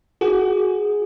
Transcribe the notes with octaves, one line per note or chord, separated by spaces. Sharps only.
F#4 G#4